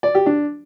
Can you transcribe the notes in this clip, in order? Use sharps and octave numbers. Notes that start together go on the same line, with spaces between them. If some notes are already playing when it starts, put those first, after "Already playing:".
D5
G4
D4